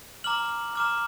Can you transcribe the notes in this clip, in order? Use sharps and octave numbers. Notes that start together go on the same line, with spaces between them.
A#5 D6 F6 F#7
A#5 D6 F6